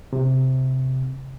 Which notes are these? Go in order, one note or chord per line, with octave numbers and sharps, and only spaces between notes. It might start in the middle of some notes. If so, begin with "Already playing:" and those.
C3